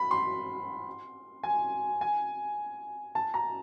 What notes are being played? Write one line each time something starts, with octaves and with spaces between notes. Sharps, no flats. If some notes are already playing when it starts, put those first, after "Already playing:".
Already playing: B5
C6
G#5
G#5
A5
A#5